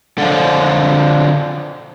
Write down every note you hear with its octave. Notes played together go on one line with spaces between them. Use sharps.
D3 F3